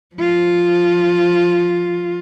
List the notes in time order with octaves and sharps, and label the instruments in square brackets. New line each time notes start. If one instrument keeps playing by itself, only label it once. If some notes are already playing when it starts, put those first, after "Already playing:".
[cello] F3 F4